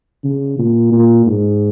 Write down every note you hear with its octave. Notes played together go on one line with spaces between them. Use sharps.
C#3
A#2
A#2
G#2